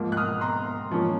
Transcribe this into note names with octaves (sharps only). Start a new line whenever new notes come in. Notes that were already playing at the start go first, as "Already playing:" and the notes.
Already playing: G#2 F3 A#3
F#6
D#6 F6
A#5 C6
G#2 F3 A#3 C#4